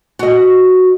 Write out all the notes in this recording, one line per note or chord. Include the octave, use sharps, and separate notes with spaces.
F#4 D#5